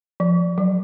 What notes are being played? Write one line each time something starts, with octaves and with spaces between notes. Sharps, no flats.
F3
F#3